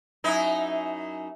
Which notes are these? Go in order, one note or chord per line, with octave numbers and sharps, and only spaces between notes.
F#2 D#4 E4